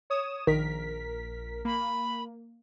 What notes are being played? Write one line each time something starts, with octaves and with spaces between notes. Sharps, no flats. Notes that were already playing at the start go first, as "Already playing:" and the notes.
C#5 D#6 E7
A#1 D#3 A#4 B6
A#3 B5